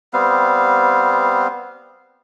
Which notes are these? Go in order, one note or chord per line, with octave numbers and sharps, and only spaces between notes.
G3 B3 C4 F5